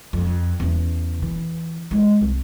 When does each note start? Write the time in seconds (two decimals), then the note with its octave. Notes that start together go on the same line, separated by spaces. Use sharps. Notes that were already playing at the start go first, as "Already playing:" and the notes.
0.13 F2
0.60 E2 C#3
1.22 E3
1.91 G#3 E4
2.21 C2